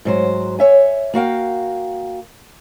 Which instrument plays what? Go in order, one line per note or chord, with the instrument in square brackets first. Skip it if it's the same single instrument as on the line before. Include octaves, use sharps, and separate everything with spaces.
[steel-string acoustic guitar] G#2 F#3 C5
C#5 E5 G#5
A#3 F#4 F5 G5